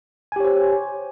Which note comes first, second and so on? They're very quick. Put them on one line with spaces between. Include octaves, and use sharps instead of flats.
G#5 G4 C#5 C5